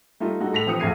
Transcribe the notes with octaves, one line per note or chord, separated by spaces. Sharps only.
G3 A3 D#4 F4
G3 G#3 D#4 F#4 A4
A2 A4 A#6 B6 F7
E3 F3 C4 G4 D#6 C#7
A#1 F2 A3 G#6 C7 D#7